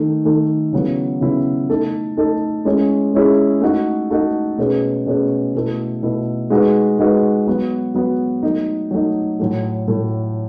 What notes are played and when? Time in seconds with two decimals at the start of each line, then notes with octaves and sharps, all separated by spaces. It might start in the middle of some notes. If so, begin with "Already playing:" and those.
Already playing: D#3 A3 D#4
0.25 D#3 A3 D#4
0.73 C#3 F#3 B3 E4
1.21 C#3 F#3 B3 E4
1.70 A3 D#4 A4
2.17 A3 D#4 A4
2.65 G#3 C#4 E4 G#4
3.14 G#3 C#4 E4 G#4
3.61 A3 D#4 F#4 A4
4.11 A3 D#4 F#4 A4
4.58 B2 A3 C#4 G#4 B4
5.06 B2 A3 C#4 G#4 B4
5.55 B2 A3 E4
6.03 B2 A3 E4
6.50 G#3 D#4 F#4 B4
6.99 G#3 D#4 F#4 B4
7.47 F#3 B3 F#4
7.95 F#3 B3 F#4
8.43 F#3 A3 D#4
8.91 F#3 A3 D#4
9.39 A2 F#3 A3
9.88 A2 F#3 A3